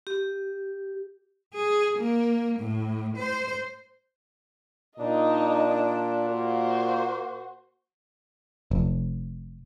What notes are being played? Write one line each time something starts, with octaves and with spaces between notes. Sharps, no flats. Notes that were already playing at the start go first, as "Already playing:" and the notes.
G4
G#4
A#3
A2
C5
A#2 D4 D#4 D#5
A#3 F#4 C5
F1